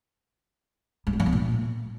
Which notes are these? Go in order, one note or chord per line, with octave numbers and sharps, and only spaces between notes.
G3
C4
F3
B3
A#2